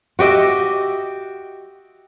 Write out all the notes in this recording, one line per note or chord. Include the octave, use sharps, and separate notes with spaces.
F#4 G4 D#5 E5